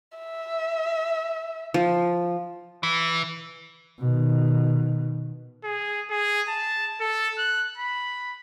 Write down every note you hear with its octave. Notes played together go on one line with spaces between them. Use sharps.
E5
F3
E3
B2 D#3
G#4
G#4
A5
A4
F#6
B5